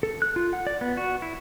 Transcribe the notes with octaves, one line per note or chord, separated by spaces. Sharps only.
A4
F#6
F4
F#5
D5
B3
F#4
E4